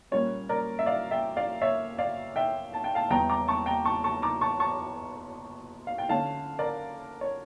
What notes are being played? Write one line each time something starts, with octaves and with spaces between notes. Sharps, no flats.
A#2 G3 A#3 C#4 C#5
A#4 D5
E5
D5 F5
E5 G5
D5 F5
C#5 E5
D5 F5
E5 G5
A5
G5
F5 A5
E2 E3 G3 G5 A#5
A#5 D6
A5 C#6
G5 A#5
A5 C#6
A5 C#6
A#5 D6
A5 C#6
A5 C#6
F5
G5
D3 A3 C#4 F5 A5
A#4 D5
C#5